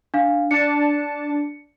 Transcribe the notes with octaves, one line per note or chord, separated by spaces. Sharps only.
D4 F5
D4 A5 C#7